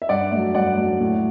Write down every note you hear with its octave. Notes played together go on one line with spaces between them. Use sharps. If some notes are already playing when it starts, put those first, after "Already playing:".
E5
G2 D5 F#5
F#3 A3
G2 D5 F#5
F#3 A3
A2